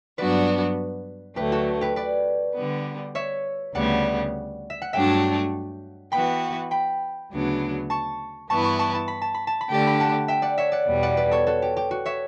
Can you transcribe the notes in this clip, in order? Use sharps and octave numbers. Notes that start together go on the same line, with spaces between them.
G2 F#3 B3 D4 F#4 B4 D5
D2 D3 F#3 A3 G4 B4
F#4 A4
G4 B4
B4 D5
D3 G3 B3
C#5 E5
D2 C#3 G3 B3 D5 F#5
E5
F#5
G2 F#3 A3 D4 E5 G5
E3 B3 F#4 B4 G5 B5
G5 B5
D2 C#3 F#3 B3 D4
A5 C#6
G2 E3 B3 E4 B4 A5 C#6
A5 C#6
A5 C#6
A5
B5
A5
B5
A5
B5
D3 A3 D4 G4 A5
B5
F#5 A5
E5 G5
D5 F#5
C#5 E5
D5 F#5
E2 B2 G3
D5 F#5
B4 D5
A4 C#5
F#4 A4
G4
G4
F#4
C#5 E5